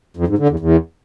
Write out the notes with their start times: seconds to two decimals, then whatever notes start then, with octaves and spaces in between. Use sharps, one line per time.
0.17 F2
0.28 G#2
0.38 D3
0.49 E2
0.59 E2